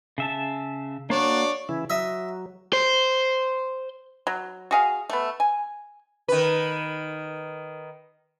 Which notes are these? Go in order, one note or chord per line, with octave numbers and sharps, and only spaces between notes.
C#3 E5 A5
A#3 D4 F#4 C#5 D5
C#3 E3 E4
F#3 D#5 E5
C5
F#3
F#4 G#4 F5
A3 B3
G#5
D#3 B4